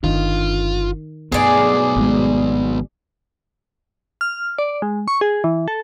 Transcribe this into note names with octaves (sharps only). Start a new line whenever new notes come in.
G1 D#3 D4 F4
B1 G2 A3 B3 G#4 D5
G#1 B2 G#3
F6
D5
G#3
C#6
G#4
E3
A4